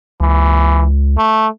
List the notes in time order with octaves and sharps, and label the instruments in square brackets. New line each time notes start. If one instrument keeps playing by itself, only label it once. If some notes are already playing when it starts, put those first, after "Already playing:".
[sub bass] C#2 [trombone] E3
[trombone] A3